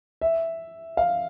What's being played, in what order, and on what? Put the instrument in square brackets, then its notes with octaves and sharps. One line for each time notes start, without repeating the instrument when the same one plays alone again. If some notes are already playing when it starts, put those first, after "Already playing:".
[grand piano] E5
F5